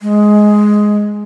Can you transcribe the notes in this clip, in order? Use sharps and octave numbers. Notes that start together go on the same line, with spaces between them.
G#3